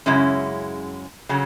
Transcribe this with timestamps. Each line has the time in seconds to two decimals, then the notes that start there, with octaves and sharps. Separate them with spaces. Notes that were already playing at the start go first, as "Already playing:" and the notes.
0.06 F#2 C#3 G#3 C#4 E4
1.29 C#3 F#3 C#4